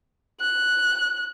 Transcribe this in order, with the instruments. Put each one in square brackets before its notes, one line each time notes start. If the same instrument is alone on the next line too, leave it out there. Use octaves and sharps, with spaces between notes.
[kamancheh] F#6